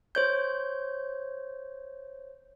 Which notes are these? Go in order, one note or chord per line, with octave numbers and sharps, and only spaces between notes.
C5 C#5 G6